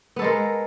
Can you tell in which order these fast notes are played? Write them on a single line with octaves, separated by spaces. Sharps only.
B3 A4 G#3 A#4